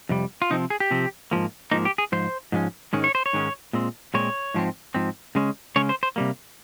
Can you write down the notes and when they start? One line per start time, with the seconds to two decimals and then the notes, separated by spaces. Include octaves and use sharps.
0.09 F2 C3 G3
0.42 F4
0.50 C3 F3 C4 D#4
0.70 G#4
0.80 G4
0.91 C3 F3 C4
1.31 G#2 F3 A#3
1.71 G#2 F3 A#3 D#4
1.85 G4
1.98 G#4
2.12 G#2 F3 C5
2.52 G#2 F3 G#3 C#4
2.93 G#2 D#3 G#3 C#4
3.04 C#5
3.15 C5
3.26 C#5
3.33 G#2 D#3 G#3 C#4
3.73 A#2 G#3 C4
4.14 A#2 G#3 C4 C#5
4.54 G#2 F3 C4
4.95 G#2 F3 C4
5.35 C#3 G#3 C#4
5.76 C#3 G#3 C#4 C#5
5.89 C5
6.03 C5
6.16 C3 G3 A#3